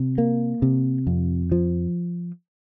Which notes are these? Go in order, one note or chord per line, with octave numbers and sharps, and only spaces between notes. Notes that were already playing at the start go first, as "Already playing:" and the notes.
Already playing: C3
A#3
C3
F2
F3